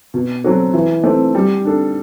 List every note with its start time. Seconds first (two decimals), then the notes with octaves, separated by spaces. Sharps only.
0.14 B2
0.44 F#3 C4 F#4 A4
0.74 E3
1.04 A3 C4
1.35 G3
1.65 D4 A4